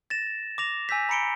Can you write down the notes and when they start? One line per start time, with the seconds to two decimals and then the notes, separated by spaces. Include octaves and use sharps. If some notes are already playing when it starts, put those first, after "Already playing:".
0.10 A6 A#6 E7
0.58 D6 A#6 F7
0.89 G#5 E6 G6 B6
1.09 A#5 B5 C#7 D7 G7